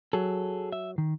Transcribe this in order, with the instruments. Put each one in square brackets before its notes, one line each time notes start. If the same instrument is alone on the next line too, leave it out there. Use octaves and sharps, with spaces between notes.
[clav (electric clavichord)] F#3 [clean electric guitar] G#4 A4
[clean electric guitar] E5
D#3